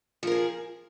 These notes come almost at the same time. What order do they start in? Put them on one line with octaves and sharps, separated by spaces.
F3 A#4 G#4